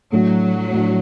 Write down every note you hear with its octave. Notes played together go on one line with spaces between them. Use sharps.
A2 F#3 A3 D4
A2 A3 D4